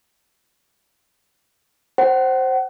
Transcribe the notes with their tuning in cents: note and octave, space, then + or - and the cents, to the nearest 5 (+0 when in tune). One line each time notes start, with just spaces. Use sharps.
C5 +10 F#5 +35